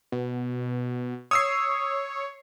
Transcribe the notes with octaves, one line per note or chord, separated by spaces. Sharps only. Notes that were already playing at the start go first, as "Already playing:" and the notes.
B2
C#5 D#6 E6 C7